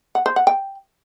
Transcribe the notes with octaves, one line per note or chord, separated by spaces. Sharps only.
F#5
C5
F#5
G5